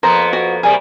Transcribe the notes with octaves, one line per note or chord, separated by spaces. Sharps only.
F2 A#3 B3 C5 A#5
F#4
C3 G3 A#3 G#4